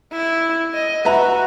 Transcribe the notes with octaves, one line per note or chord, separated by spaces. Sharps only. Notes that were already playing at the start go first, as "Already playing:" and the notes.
E4
D#5
F#4 B4 E5 A#5